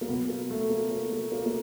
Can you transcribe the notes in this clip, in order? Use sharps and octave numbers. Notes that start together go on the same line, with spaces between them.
A#3
B2 F#3 B3
A#3
A3
A#3
A#3
A#3
A#3
A#3